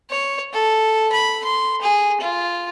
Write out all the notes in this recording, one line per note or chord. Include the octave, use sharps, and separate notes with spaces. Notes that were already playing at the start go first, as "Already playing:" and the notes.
C#5
A4
B5
C6
G#4
F4